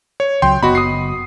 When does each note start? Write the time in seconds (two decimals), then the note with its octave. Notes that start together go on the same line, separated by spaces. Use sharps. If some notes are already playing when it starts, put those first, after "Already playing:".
0.20 C#5
0.42 C#2 F#3 G5 C6
0.63 F#1 B3 F#4 D#5 B5
0.75 D#6 C7